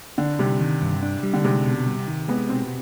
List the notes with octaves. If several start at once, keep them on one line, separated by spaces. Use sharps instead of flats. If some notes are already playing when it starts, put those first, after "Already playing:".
D3 D4
C3 G3
D#3
G2
D4
G3
D3
C3 G#3
B2
G3
D#3
G#3 B3
B2 C4